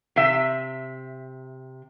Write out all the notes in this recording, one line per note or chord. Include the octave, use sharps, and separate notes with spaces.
C3 E5